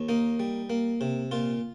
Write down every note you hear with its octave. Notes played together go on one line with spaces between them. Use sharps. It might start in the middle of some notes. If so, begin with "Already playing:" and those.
Already playing: D#2
A#3 D#4
G3
A#3
C3
A#2 F4